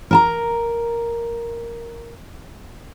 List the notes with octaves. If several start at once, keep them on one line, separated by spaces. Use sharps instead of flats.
A#4 A5 A#5